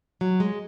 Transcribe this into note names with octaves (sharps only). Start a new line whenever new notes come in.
F#3
G#3